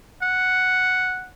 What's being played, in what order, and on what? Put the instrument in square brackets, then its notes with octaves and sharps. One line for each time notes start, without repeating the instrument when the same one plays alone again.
[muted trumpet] F#5